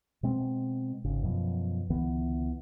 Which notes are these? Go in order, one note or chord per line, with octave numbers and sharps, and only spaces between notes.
B2 G#3 C4
G#1 C#3
F#2 B2 F3
C#2 D3 E3 B3